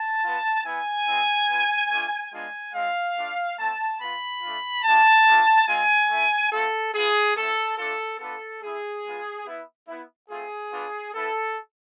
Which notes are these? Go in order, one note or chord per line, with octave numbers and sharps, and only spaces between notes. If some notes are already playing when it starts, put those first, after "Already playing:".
Already playing: A5
B3 F4
B3 E4 G#5
G#3 C4 E4
B3 F4
A3 D4 F4
G#3 B3 D4 F4 G#5
G#3 C4 F4 F5
A3 D4 F4
A3 C4 F4 A5
B3 F4 B5
A3 D4 F4
G#3 D4 F4 A5
A3 D4 F4
G#3 C4 F4 G#5
A3 E4
A3 C4 F4 A4
B3 F4 G#4
A3 C4 E4 A4
A3 D4 F4 A4
B3 D4 F4 A4
A3 E4 G#4
G#3 B3 F4
B3 E4
B3 E4
A3 C4 F4 G#4
B3 D4 F4
B3 E4 A4